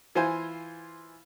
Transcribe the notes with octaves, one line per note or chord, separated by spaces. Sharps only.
E3 F4 C5 G#5